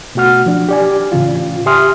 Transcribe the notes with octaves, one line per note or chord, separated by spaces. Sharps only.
B2 A3 F#4 F#5 F6
F3 D4
G4 D5 G#5
A2 C#3 E3 F4
G4 E5 G#5 C6 D#6 F6